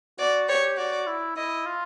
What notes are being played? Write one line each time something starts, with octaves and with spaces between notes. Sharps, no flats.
F#4 D5
G4 C#5
F#4 D5
E4
E4 D#5
F4